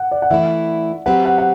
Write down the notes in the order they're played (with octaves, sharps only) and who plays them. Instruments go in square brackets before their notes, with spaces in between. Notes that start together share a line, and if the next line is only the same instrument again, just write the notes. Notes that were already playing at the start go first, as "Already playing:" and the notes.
Already playing: [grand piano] F#5
D5
F#5
[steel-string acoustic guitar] E3 A3 E4 [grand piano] E5
[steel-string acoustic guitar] F#3 C4 G4 B4 [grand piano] F#5
[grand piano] F#5
F#5